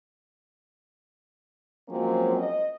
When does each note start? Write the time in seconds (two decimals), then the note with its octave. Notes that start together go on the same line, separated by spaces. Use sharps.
1.89 F3 F#3 G#3 A#3 C4 C#4
2.36 D#5